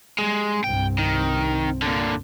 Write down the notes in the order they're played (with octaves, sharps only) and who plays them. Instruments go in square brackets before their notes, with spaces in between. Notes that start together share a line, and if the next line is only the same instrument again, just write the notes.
[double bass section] G3 [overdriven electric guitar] G#3
[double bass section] C2 G2 C4 [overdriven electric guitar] G5
[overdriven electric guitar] D#3
A#2 D3